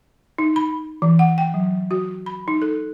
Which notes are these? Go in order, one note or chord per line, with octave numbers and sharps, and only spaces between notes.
D#4
B5
E3
F#5
G5
F#3
F#4
B5
D#4
A4